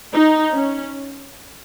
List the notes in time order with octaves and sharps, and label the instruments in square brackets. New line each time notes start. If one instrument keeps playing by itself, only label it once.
[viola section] D#4
C#4